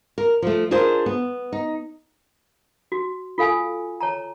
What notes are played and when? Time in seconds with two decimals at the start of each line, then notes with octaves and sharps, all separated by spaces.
0.18 A#4
0.42 F3 A3
0.71 D4 F4 G#4 A#4 C5
1.06 B3
1.53 D#4
2.92 F#4
3.38 F4 A4 F5 G#5 E6
4.01 C#5 A5 A#5